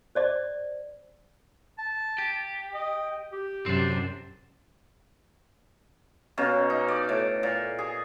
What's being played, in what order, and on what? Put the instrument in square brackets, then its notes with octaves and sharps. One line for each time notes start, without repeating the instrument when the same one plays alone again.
[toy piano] C5 D5 D#5
[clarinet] A5
[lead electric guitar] G4
[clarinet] D#5
G4
[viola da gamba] F#2 C3 [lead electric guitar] C4 D4
[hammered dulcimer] B2 A#3 C#4
D#4
D5
A2
A#2
G#4